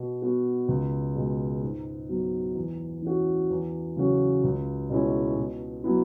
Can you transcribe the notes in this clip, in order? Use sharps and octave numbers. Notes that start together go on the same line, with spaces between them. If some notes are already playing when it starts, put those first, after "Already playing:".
Already playing: B2
B3 F#4
C#2
B2 G#3
G#2
F#3 B3
E2
E3 C#4 F#4
E2
C#3 F#3 C#4 F#4
C#2
B2 G#3 C#4 E4
B2
F#3 B3 E4